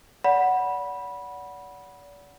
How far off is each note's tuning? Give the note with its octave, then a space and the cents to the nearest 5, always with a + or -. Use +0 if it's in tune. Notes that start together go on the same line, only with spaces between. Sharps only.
D5 -40 F#5 +0 B5 -15